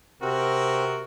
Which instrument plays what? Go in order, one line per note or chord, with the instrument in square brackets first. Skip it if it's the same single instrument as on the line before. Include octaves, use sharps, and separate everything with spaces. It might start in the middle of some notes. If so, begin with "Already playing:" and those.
[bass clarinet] C3 [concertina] C4 [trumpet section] F#4 A#4